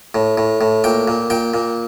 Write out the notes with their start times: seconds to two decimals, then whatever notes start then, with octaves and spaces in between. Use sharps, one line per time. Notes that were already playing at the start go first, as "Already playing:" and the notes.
0.15 A2
0.38 A2
0.61 A2
0.84 A#2 G5
1.08 A#2
1.30 A#2 G5
1.54 A#2